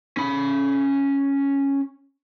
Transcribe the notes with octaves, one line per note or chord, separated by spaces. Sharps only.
C#4 B5